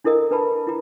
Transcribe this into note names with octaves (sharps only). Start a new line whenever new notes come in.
D4 E4 A4 A#4 D#5
D4 B4 A5 B5
E4 A#5